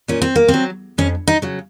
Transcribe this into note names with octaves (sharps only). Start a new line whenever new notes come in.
A#2 C#4
C4
A#3
C4
F#3
F2 C#4
D#4
C#3 F#3